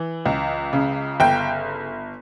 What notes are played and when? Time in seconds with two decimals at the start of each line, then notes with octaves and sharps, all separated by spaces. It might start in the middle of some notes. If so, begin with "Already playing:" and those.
Already playing: E3
0.26 C#2
0.73 C#3
1.20 G1 G5